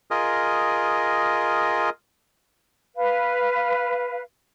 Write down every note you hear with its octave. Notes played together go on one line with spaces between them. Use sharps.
F4 G#4 A#4 D#5
B4 F5